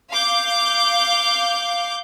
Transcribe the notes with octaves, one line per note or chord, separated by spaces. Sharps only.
F5 D6 G6